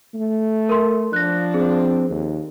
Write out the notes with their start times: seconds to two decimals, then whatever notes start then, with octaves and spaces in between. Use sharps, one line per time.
0.14 A3
0.69 A#4 C6
1.13 F3 D4 F#6 A#6
1.54 C4 G#4
2.10 D#2